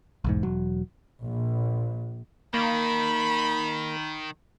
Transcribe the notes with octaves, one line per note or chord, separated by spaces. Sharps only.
B1 E2 G#2
E1 F#3
A#1
D#3 A#3 B5